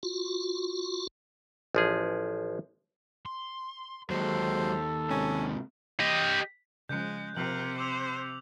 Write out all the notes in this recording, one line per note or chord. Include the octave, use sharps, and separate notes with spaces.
F4 F#4
A1 F3 G#4
C6
D#2 F#3 G#3 A4 C5
G#2 C3 C#4
G4 D#5
C#3 F3 G#3 F#6 G6
C3 F3 A#4 F#7
C5 D6 E6 F7